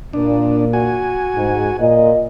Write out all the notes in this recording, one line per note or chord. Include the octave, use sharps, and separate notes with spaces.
A#2 D4
F#4 G#5
G#2
A#2 D#5